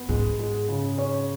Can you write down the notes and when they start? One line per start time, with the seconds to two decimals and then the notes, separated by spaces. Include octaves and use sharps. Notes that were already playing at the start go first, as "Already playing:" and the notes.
Already playing: B3
0.09 G#2 G#3
0.39 G#3
0.68 C#3
0.98 C#4